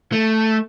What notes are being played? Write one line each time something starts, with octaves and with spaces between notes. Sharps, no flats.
A3